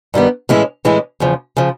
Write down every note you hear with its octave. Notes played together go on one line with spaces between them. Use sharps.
G2 D#3 G3 B3
A2 E3 G#3 C#4 E4
A2 E3 G#3 C#4 E4
E2 C#3 F3
C#3 F3